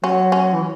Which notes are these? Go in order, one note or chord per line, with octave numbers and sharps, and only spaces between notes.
F#3 C#4
C#4
E3